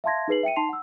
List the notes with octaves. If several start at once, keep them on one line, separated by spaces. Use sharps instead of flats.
E5 F5 A5 C6 G#6 A#6
D#4 G#4 B4 C7 F#7
E5 G5 C#7 D#7
D#4 A5 C6 C7 F7
F#5 E6